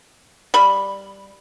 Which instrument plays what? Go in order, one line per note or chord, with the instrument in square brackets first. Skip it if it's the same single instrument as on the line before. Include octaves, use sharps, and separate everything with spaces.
[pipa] G3 B5